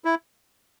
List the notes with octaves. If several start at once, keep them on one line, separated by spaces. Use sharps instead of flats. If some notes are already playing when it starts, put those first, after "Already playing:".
E4